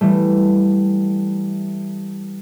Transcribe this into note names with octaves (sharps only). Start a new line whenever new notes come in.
E3 G3 A3